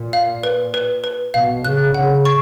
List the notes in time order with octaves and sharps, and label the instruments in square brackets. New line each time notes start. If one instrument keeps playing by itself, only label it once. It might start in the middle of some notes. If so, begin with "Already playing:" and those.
Already playing: [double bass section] A#2
[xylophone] F5
B4
B4
B4
[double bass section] B2 [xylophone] F5
[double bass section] C#3 [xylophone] F#6
[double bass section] C#3 [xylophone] F#5
[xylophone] C#6